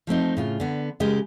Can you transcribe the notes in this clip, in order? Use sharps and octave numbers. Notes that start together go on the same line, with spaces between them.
F3 A3 C4 D#4
A2 C#3 F4
D3 B3
C#3 G#3 G4 A#4